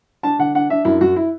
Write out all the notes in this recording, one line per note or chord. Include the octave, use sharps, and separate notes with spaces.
D4 A5
D3 F#5
D4 F#5
D4 E5
F#2 E4
F#2 F#4
E4